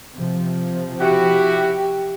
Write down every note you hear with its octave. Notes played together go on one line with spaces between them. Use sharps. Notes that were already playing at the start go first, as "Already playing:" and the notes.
C3 F3
E4 F#4 G4